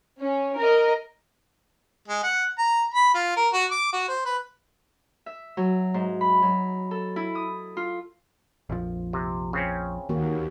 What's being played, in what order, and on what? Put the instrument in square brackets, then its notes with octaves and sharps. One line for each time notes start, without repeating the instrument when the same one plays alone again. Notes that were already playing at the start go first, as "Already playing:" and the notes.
[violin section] C#4
A#4 D#5
[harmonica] G#3
F#5
A#5
B5
F4
A#4
F#4
D6
F#4
C5
B4
[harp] E5
F#3
G#2
B5
F#3
A4
E4
D#6
F4
[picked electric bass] A#1 F2 F3
[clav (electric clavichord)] C3
C#3 C4 C#4
[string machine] D#2 [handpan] D#3 A#3 F#4